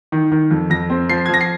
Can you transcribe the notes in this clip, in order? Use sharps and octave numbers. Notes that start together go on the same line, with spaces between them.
D#3
D#3
F2
F2 A#6
C4
F3 C7
G#6
F3
A#6
C7